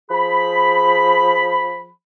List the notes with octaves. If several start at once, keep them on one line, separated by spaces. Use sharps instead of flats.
F3 G#4 B5